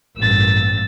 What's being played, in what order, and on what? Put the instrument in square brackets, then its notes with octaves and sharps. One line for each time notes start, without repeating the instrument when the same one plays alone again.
[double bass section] A1 G2 A#3 [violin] E6 A6